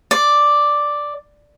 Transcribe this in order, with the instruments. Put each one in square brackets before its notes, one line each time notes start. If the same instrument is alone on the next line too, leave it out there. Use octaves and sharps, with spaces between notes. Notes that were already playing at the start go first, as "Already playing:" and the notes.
[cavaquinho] D5